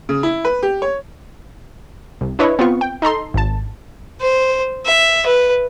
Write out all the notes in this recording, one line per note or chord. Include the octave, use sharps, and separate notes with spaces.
C#3
E4
B4
G4
C#5
C2
D4 E4 B4 C#5 D#5
B3 C4 F4 C#6
G5
D#4 A4 A#5 C6
G#1 A5
C5
E5
B4